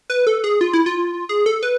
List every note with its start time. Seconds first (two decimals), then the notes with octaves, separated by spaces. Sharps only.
0.10 B4
0.27 A4
0.44 G#4
0.61 F4
0.73 E4
0.86 F4
1.29 G#4
1.46 A4
1.63 B4